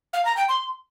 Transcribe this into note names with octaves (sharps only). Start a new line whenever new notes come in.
F5
A#5
G5
C6